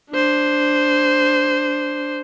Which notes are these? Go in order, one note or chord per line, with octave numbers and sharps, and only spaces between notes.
D4 C5